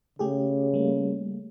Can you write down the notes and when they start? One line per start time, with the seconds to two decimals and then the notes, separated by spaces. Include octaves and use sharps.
0.19 C#3 A3 G4 G#4
0.74 G3 A3 A#3